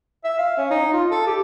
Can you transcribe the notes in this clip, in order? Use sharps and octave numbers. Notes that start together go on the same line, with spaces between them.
E5
F5
C#4
D#4
F4
A4
G4